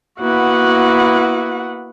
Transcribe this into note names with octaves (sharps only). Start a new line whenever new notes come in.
A#3 B3 E4 F#4 F#5